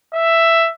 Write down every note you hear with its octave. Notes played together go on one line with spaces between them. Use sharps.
E5